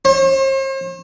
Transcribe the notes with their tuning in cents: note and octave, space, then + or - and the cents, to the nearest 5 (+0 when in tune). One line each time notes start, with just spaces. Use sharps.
C5 +45